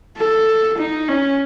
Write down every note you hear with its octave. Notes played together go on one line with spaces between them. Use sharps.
A4
D#4
C#4